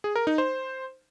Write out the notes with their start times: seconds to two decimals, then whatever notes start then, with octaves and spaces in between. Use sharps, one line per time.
0.04 G#4
0.16 A#4
0.27 D#4
0.38 C5